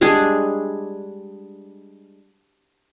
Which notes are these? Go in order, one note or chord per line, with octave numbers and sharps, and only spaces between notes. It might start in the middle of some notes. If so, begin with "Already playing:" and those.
G3 G#3 D4 G#4